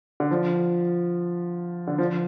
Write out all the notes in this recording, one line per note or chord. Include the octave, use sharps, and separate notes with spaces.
D3
F3
D3
F3